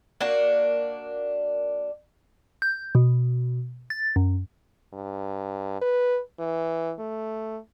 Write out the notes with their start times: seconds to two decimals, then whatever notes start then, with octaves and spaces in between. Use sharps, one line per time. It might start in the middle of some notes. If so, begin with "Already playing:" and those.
0.21 A#3 D4 F#4
2.62 G6
2.95 B2
3.90 A6
4.16 F#2
4.93 G2
5.81 B4
6.39 E3
6.99 A3